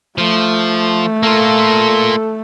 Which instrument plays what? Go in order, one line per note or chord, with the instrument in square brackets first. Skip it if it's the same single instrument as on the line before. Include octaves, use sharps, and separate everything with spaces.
[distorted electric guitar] F3 [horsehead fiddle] A3
[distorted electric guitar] A#3 F4 [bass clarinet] A4